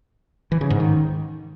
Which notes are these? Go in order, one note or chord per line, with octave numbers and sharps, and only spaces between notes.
E3
C#3
G#2
D#3